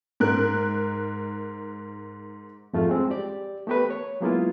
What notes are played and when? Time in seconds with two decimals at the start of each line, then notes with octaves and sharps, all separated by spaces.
0.20 G#2 A#4 F#6
2.73 F2 G#2 A3 D#4 F4
2.87 G3 G#3 C4
3.10 G4 D5
3.67 A3 B3 G4 A#4 B4
3.90 C#5
4.21 F#3 G#3 A#3 B3 E4 F4